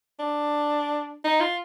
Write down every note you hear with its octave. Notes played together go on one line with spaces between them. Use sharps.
D4
D#4
F4